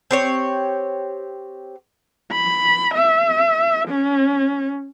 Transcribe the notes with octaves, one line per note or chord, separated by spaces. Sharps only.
C4 G4 C#5
B5
E5
C#4